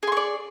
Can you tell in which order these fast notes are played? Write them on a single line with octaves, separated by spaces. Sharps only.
G#4 C6 C#6 D5